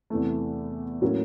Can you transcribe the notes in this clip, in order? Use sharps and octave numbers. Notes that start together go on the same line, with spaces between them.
E2 C3 E3 A3
A2 F#3 A#3 C#4